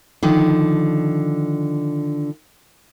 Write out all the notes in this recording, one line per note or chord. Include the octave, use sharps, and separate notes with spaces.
D3 D#3 F3